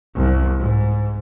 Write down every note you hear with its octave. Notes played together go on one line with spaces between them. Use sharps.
C2
G#2